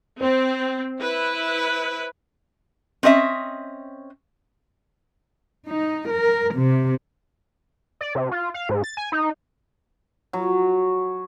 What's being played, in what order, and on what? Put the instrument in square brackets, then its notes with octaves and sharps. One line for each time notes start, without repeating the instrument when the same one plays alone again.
[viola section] C4 [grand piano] C5
[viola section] E4 B4
[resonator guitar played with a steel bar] C4 C#4 D#5 E5
[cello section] D#4
A#4
C3
[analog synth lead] D5
C3
F4
F5
G#2
A6
G#5
D#4
[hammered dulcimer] F#3